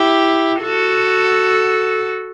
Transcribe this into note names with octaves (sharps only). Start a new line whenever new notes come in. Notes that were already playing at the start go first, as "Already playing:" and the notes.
Already playing: E4 G4
F#4 A4